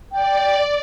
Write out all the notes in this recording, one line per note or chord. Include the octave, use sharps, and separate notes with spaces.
D5 G5